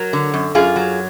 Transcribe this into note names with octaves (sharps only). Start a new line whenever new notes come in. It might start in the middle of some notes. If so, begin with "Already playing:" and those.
Already playing: F#3 F#4 A#4
D3
F#2
F#2 F4 G#4
F#3